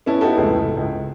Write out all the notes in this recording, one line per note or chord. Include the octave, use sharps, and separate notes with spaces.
B3 C#4 E4 A4
B3 D#4 E4 F#4 G4 A4
F1 C#2 A2 G#4 A4
C#2